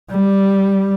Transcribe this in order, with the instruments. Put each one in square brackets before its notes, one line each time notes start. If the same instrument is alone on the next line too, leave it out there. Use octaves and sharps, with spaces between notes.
[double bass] G3